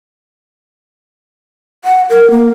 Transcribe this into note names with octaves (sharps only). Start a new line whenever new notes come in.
F#5
A#4
A#3